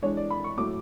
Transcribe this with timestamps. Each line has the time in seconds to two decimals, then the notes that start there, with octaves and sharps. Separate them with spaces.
0.02 E3 G#3 D4 C#5
0.17 D5
0.30 B5
0.44 C#6
0.57 A2 F#3 A3 D6